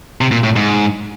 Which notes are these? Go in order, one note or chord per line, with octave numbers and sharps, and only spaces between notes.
C3
A#2
A2
G#2